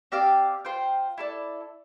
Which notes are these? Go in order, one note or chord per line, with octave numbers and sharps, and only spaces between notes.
C4 G4 D5 F5
F4 C5 G5
E4 A4 D5